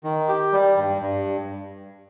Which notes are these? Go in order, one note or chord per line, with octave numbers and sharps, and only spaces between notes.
D#3
G4
G3
G2
G2